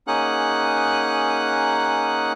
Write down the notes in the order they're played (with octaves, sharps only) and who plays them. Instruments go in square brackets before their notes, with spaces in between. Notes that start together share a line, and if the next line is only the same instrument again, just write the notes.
[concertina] A#3 C#4 D#4 G#4 F#5 F#6